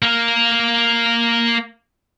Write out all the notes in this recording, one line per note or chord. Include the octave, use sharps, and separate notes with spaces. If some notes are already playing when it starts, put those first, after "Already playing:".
A#3 A#4